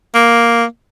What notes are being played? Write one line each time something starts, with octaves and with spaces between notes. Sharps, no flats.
A#3